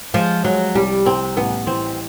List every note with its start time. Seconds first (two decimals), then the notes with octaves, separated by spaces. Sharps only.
0.14 F3 G#3
0.44 F#3 G#3
0.75 C2 G3
1.05 C2 C4
1.37 A1 B3
1.67 E3 C4